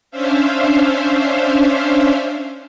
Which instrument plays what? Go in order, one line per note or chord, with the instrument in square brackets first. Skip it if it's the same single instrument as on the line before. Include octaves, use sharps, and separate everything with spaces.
[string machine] C#4 D4 C5 E5 F5